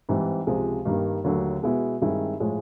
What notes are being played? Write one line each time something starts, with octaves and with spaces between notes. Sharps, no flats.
G#2 E3 G3 C4
C#2 C3 F3 G#3
G2 D#3 G3 A#3
D#2 D3 F#3 A3
B2 G#3 B3 E4
G2 D#3 G#3 C4 E4
A2 F3 G#3